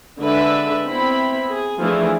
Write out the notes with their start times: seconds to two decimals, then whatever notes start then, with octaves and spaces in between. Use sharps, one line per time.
0.20 D3 G#3 D4 B4 E5
0.87 B3 C4 E4 B5
1.50 G#4
1.82 E3 F3 A3 D4 G#4